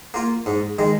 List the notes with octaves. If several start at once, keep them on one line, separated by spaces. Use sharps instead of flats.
A#3 F4
G#2
D#3 G#3